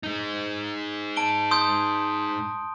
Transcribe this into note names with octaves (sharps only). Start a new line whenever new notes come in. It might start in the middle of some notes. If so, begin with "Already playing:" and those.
G#3 D#4
A5 D7 G7
C6 D#6 G6